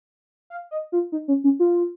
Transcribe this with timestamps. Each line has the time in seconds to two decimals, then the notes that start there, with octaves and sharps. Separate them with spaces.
0.50 F5
0.71 D#5
0.92 F4
1.12 D#4
1.28 C#4
1.44 C#4
1.60 F4